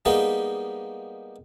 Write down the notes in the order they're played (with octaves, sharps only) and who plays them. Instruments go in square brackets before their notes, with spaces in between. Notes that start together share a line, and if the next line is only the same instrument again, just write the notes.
[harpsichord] G3 G#3 A#3 B3 D#4 G4